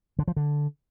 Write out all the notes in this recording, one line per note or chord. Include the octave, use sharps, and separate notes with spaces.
D3
F3
D3